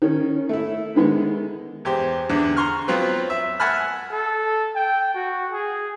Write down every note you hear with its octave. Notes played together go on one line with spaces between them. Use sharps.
D#3 C#4
A3 E4
D3 D#3 G#3 B3
E2 G4 C5
E2 D3
A#5 C6 C#6 F6
F#3 B3 C4 F4 B4
E5
E5 F#5 G#5 A5 B5 F6
A4
G5
F#4
G#4